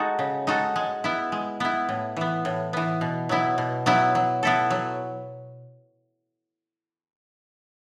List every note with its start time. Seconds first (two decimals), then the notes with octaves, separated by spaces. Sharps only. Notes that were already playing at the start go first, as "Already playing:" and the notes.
Already playing: G#3 D#4 F#4 A4
0.19 C#3
0.47 G#3 D#4 F#4 A4
0.76 G#3
1.04 B3 E4
1.32 G#3
1.60 B3 E4
1.89 A2
2.17 E3 B3
2.45 A2
2.73 E3 B3
3.01 B2
3.29 F#3 B3 E4
3.58 B2
3.86 F#3 B3 E4
4.15 F#3
4.43 B3 E4 A4
4.70 F#3